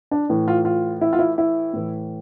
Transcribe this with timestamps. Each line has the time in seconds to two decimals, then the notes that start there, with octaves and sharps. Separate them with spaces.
0.11 D4
0.30 A2 E3
0.48 F4
0.65 F4
1.01 E4
1.13 F4
1.19 E4
1.38 E4
1.73 A2 E3